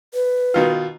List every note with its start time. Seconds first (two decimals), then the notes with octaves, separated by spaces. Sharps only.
0.14 B4
0.54 B2 D#3 F4